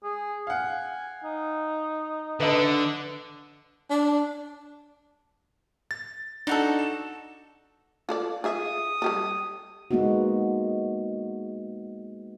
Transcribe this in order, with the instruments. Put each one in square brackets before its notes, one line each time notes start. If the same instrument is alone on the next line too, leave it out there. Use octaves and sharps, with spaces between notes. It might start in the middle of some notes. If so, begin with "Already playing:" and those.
[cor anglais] G#4
[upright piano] F5 F#5 [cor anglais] G#5
[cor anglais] D#4
[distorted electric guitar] D3 [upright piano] B4 D#5 A5
[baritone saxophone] D4
[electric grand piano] A6
[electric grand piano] D4 [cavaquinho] D#4 F#4 A4
[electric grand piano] E7
[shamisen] F4 A4 D5
[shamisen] F4 G#4 E5 [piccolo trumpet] D#6
[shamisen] G3 G4 A4
[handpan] G#3 A#3 B3 D#4 F#4